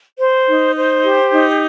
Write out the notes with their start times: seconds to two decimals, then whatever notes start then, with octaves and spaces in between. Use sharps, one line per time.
0.19 C5
0.48 D#4
0.75 C5
1.04 G4
1.32 D#4